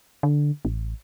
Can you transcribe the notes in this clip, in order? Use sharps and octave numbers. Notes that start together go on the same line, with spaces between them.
D3
A1